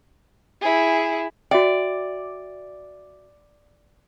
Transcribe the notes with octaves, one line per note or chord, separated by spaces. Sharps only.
E4 G#4
F#4 D5 E5 G5